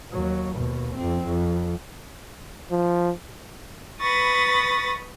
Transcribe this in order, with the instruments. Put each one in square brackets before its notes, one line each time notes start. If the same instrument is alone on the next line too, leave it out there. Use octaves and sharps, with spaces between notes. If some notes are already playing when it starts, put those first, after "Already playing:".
[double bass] D#2 F#3
D#2 B2
F2 C4
F2
[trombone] F3
[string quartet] B4 B5 C#6 D#6 A6 A#6